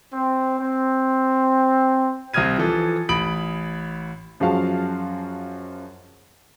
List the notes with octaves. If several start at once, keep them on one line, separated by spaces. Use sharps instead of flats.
C4
C4
C2 C4 D#6 F6 G#6 D#7
E3 F3 A4
A1 B5 D#6 D7 F#7
F#2 F3 G#3 F#4 F5 A5